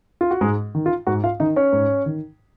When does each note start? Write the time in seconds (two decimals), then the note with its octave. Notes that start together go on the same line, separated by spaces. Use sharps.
0.21 F4
0.31 F#4
0.41 G#2 G#3 G#4
0.75 D#3
0.86 F4
1.07 G#2 F#4
1.24 F4 F5
1.40 D#3 D#4 D#5
1.56 C#4 C#5
1.73 G#2
2.06 D#3